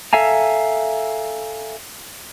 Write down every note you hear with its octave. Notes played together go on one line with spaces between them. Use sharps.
A4 E5 F5 G#5 A#5